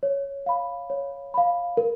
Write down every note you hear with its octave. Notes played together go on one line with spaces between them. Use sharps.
C#5
F5 B5
C#5
F5 B5
A#4